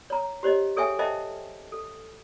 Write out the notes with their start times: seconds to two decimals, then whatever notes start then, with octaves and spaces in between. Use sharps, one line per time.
0.10 C#5 A#5
0.43 G4 C5 C#5 D#5
0.77 G#4 A4 C#5 E5 G5 G#5
0.99 A4 C5 D#5 E5 G5 A5
1.72 A4